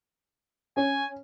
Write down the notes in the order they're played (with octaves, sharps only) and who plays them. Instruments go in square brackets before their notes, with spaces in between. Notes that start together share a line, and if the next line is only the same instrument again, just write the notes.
[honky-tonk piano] C#4 [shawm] G#5